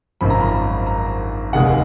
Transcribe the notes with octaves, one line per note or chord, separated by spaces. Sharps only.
G#1 F#2 F3 B5
A#5
B5
A#5
F1 D#2 C#3 G#3 F#5